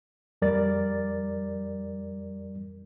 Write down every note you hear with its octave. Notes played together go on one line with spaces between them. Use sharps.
F2 G3 A#4 D5 A6